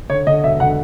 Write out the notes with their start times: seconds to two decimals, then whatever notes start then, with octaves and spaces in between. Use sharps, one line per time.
0.10 D3 C#5
0.27 D3 D#5
0.44 E1 E5
0.60 D3 F#5